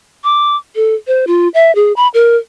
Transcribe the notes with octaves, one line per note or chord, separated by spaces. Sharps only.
D6
A4
C5
F4
E5
G#4
B5
A#4